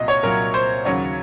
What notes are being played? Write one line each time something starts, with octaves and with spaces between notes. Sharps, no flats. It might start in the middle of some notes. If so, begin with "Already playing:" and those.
Already playing: C2 A#2 F#3 D#5
C#5
C2 A#2 F#3 A#4
C5
D#2 C#3 F#3 C#5